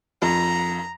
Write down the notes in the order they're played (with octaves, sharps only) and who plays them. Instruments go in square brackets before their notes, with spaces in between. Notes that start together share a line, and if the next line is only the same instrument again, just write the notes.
[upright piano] F2 [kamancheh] A#5